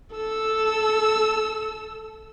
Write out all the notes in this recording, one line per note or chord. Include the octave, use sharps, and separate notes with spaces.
A4 E6